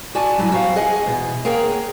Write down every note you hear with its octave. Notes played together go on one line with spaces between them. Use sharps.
F#4 D5 G#5 A5
F#3 G3 E4 G#5
F#4 G4 C5 C#5 F5 F#5
G#4 D#5 F#5 G#5
E2 B2
A#3 G#4 A#4 C#5 F#5 G5